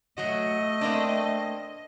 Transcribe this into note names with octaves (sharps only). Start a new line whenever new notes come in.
F#3 A3 F#4 D#5
A#3 C4 D4